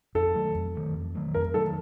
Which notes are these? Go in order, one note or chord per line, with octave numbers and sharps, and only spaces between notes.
F2 A4
D#3 F#3 A3
F2
D#3 F#3 A3
F2
D#3 F#3 A3
F2 A#4
D#3 F#3 A3 A4